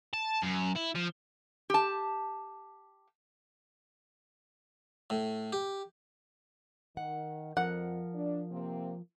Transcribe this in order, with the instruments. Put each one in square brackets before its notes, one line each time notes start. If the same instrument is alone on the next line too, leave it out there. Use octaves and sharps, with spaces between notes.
[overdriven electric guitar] A5
F#2
E4
F3
[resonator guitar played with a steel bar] G4 A5
[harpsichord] A2
G4
[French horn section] D#3 [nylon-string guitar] F#5
[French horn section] F2 [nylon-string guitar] F3 A#4 [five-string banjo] F#5
[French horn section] D4
C3 A#3 C4